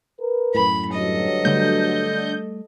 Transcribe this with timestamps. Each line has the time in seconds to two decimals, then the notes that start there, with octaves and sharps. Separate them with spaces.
0.20 A#4 B4
0.55 F#2 A2 B5
0.90 D2 G2 F#3 A4 D#5
1.45 D3 G3 A3 G6